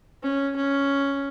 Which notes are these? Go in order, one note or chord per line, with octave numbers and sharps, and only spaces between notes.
C#4
C#4